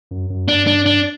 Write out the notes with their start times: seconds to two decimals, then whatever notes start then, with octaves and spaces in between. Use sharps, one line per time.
0.11 F#2
0.30 F#2
0.48 G2 D4
0.67 D4
0.86 D4